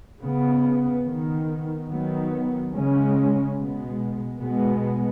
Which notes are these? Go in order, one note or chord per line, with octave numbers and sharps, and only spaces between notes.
C#3 B3
D#3 B3
D#3 F#3 B3
C#3 G#3 C#4
B2 G#3 B3
B2 G#3 B3